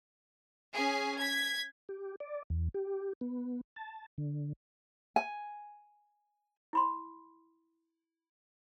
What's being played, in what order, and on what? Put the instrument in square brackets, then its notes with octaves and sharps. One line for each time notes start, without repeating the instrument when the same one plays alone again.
[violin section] C#4 G#4 G#5
G#6 B6
[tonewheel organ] G4
D5
E2
G4
B3
A5
D3
[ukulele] G#5
[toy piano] E4 B5 C6